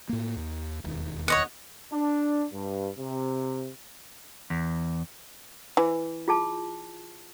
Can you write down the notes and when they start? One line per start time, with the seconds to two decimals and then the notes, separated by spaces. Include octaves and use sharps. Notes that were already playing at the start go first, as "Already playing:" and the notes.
0.09 A2 A#3
0.36 D#2
0.84 E1 D#2
1.28 C#5 D#5 F#5
1.93 D4
2.53 G2
2.99 C3
4.50 E2
5.77 E3
6.28 F4 G#4 A5